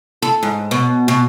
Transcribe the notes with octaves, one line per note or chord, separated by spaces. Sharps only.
A4
G#2
B2
B2